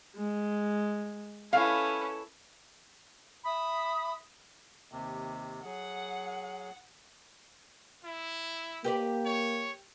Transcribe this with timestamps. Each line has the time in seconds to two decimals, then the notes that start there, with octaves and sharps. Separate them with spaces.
0.16 G#3
1.53 C#4 E4 A4 B4 F5
3.43 E5 B5 D#6
4.92 D#2 C3
5.65 F#3 G#4 F#5
8.04 E4
8.84 A#3 G4 B4 D5
9.26 C#5